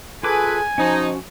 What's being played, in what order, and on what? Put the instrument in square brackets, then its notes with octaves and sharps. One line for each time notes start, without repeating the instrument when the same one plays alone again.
[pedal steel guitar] F4 D6 [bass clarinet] G#4 [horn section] A4 B4 [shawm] G#5
[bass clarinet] F3 [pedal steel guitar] C#4 F#4 [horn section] D#4